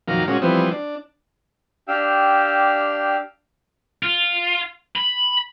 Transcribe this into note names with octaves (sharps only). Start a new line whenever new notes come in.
F2 A#2 D#3 F#3 F5 A#5
A#2 G#3 C#4 F#4
E3 F3 G3 B3 C4
D4
D4 G4 F5 G5 E6
F4
B5